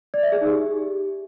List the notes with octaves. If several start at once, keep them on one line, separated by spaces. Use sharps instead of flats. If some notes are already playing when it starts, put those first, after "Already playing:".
D5
E5
G#4
D#4
G4